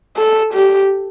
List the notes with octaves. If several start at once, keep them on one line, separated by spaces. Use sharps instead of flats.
A4
G4